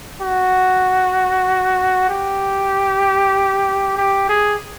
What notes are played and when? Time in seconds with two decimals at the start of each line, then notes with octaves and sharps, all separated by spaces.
0.21 F#4
2.09 G4
3.97 G4
4.29 G#4